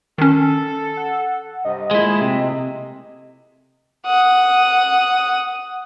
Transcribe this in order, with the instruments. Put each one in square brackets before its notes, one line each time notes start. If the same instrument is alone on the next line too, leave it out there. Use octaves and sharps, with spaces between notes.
[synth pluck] D#3 C#4 [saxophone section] A4
[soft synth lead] F#5
[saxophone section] G2 C3 [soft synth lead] D#5
[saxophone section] A#2 F3 A3 [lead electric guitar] G#3 E4
[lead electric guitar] C3
[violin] F#5 D#6